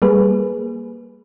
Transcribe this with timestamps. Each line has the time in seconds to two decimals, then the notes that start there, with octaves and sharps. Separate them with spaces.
0.02 G3 A#3 G#4 B4